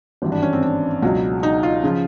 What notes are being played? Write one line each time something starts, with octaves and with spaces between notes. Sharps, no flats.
G#1 G2 E3
D4
C#4
C4
D4
C#2 B2 F#3
D#4
F4
C#3 F3